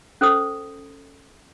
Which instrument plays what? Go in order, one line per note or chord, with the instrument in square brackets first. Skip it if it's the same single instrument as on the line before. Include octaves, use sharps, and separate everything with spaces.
[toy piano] C#4 A4 C5 D#6